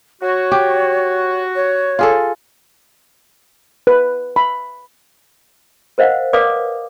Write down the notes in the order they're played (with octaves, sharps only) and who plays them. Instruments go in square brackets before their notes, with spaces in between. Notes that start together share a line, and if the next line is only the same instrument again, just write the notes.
[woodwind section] F#4 [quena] C#5
[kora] G4
[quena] C#5
[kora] F4 G#4 A4
[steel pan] B4
B5
[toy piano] A#4 C5 D#5 F5 F#5
A#4 B4 D5 F5 D6 D#6